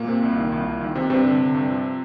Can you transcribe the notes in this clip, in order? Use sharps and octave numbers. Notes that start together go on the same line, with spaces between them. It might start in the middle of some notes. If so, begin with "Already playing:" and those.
Already playing: A#2 A#3
C3
C2
D#3
C2
C2
D#3
C3
G2 C3 C4
D3
D3
G2
F3